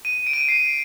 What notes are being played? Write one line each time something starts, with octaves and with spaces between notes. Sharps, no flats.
D#7
D7
D#7
D7
C7